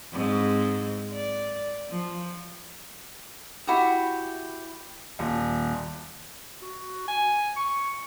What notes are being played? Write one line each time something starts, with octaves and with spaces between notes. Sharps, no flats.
G#2 C4
D5
F3
E4 F#4 G4
D#1
F#4
G#5
C#6